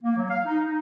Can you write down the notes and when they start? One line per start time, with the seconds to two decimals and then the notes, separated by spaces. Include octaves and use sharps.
0.03 A#3
0.16 F#3
0.30 F5
0.45 D#4
0.65 D#4